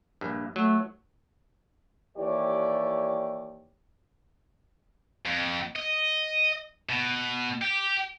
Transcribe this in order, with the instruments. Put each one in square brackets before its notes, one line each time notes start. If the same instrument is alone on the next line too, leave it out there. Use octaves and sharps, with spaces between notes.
[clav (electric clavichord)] A#1 G2
[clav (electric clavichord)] F#3 [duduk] A3
[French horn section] D#2 E3 G4 C#5 D5
[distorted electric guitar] F2
D#5
B2
G4